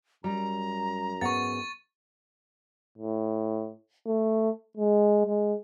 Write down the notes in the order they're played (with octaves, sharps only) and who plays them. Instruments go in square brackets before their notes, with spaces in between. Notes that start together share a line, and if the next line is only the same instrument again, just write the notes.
[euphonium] F#2 [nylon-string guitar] G3 [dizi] A#5
[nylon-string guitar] G#2 B3 F#5 [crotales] C#6 A6
[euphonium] A2
A3
G#3
G#3